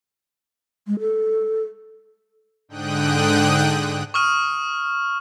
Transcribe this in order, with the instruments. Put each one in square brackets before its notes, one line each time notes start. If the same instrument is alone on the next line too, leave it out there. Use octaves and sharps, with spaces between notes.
[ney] G#3
A4
[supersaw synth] G#2 D3 G5 D#6 F#6
[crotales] C#6 D#6 F6 D#7